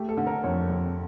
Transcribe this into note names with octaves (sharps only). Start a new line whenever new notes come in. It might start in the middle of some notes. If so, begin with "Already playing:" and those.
Already playing: A3 G4
A4
D3
A#4
F2 C#5
F2